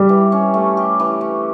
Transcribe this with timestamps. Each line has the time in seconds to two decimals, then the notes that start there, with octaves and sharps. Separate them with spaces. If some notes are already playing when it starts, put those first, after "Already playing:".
Already playing: G3 G4
0.09 E3
0.32 C#4
0.54 A3
0.77 G4
1.00 E3
1.21 C#4